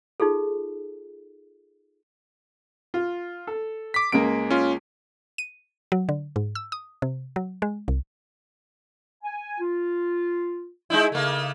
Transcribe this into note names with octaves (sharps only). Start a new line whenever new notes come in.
D#4 F4 G#4 A4
F4
A4
D6 B6
C#2 G#3 A#3 D7
C#4 F4
D#7
F#3
D3
G#2
E6
D#6
C3
F#3
G#3
C2
G#5
F4
G#3 D#4 E4
C#3 A3 A#3